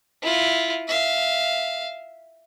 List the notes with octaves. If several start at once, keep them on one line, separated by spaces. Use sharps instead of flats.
E4 F4
E5 F5